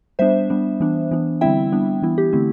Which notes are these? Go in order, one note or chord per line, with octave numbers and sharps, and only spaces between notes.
G3 B3 D4 C5 E5
G3 B3 D4
E3 B3 D4
E3 B3 D4
D3 G3 C4 E4 E5 G5
G3 B3 D4
E3 B3 E4
G4
D3 A3 C4 E4